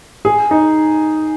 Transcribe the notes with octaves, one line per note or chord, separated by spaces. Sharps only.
G#4
D#4